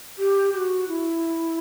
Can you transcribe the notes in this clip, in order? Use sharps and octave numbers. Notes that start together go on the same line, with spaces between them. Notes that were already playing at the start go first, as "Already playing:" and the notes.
G4
G4
F#4
E4